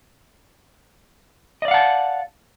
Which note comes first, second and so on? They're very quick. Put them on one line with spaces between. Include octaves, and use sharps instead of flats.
D#5 D5 F5 F#5 A5